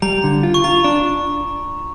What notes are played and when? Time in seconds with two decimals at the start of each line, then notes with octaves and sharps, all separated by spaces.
0.02 G3 A#5
0.24 D3
0.43 F4
0.54 C#6
0.64 F4 A#5
0.84 D4